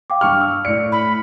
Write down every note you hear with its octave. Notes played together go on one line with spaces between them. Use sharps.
F5 G5 D6
G2 C#6 F6
E6
A2 D5 C#7
B5